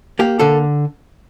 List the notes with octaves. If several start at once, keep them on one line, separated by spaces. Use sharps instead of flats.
A#3 G4
D3 A4